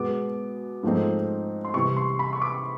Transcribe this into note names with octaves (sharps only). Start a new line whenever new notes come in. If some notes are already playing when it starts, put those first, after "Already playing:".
Already playing: B2 G#3 B3 D6
G#2 F3 A3 C4 D#4
C6
C3 E3 G3 C#6
C6
B5
C#6
D6